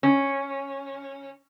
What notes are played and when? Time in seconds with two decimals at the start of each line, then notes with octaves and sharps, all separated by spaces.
0.03 C#4